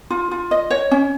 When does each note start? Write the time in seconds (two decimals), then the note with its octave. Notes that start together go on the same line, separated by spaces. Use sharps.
0.10 F4
0.31 F4
0.51 D#5
0.71 C#5
0.91 C#4